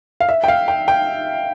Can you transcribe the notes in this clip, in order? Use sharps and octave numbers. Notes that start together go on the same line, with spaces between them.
F5
E5
G5
F5
G5
G5